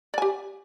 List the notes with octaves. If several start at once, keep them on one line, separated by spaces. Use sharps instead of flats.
G4 D5 G#5